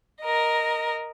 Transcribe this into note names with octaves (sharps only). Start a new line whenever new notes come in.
A#4 D#5